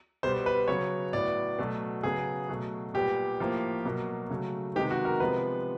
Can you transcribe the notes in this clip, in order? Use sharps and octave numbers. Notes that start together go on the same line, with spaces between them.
B2 G3 B3 C5
B4
C#3 F#3 B3 C#5
A2 F#3 B3 D5
B2 F#3 A3
C#3 F#3 B3 G#4
B2 F#3 A3
A#2 G3 B3 G4
A2 F3 A#3
B2 F#3 A#3
C#3 F#3 A3
C3 D#3 G#3 B3 G4
F#4
A#4
C3 F3 G#3 B3 B4